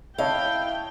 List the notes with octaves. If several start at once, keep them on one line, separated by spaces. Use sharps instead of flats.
E4 C#5 D#5 F5 G5 A5